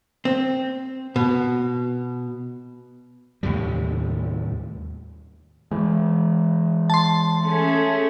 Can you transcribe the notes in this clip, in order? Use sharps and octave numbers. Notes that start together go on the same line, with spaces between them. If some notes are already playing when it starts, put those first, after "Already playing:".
C4
B2
D#2 A2 C3 G3
E3 G#3
A5 C6
A3 C#4 G#4